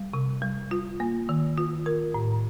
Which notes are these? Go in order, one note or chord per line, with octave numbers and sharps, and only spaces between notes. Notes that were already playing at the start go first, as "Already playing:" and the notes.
Already playing: G3
C3
G3
F4
A#3
D#3
F4
A#4
A2